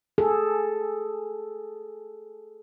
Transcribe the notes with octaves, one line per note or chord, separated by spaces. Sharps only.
G#4 A4